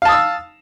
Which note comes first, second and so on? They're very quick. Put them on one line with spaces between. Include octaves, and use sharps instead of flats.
F5 A5 D#6 E6